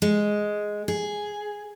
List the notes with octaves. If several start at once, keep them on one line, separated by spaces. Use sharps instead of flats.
G#3
G#4